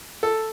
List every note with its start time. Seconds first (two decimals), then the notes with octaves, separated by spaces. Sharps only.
0.23 A4